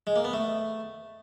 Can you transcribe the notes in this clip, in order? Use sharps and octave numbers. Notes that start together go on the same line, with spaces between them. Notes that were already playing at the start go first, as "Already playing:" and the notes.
G#3
A#3
B3
A3